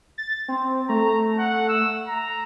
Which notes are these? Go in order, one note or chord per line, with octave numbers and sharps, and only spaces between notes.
A6
C4
A3 A#5
F#5
E6
A#5